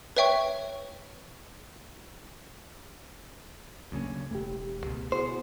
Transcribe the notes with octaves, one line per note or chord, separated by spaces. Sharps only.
B4 C#5 E5 G5 C#6
D2 C#3 F#3 A#3 C#4
E1 A3 G4
C#2 B2
B3 E4 F#4 G#4 C5